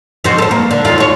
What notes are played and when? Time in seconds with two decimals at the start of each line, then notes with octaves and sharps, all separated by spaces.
0.24 F2 F#4 C5
0.38 A4 C5
0.51 A#3
0.71 D3
0.85 D#2 D3 F4
0.98 F#4 C#5